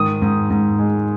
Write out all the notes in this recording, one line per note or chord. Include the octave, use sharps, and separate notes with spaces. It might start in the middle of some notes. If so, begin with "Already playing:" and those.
Already playing: G#2 D#3 D#6
G#2
G#2
G#3